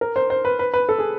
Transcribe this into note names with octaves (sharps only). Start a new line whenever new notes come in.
A#4
C5
C5
B4
B4
B4
A4
G#4